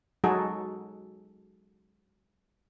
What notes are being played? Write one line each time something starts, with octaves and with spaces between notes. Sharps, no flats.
F#3 G#3 D#4 F#4 G#4 A4